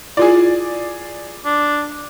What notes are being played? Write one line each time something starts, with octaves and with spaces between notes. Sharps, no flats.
E4 F4 G#4 D5
D4